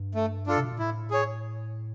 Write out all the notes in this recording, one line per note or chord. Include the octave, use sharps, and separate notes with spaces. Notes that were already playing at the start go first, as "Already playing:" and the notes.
Already playing: G2
A3
D4 F4 A4
C3
B2
A#2
A2 E4
G#4 C#5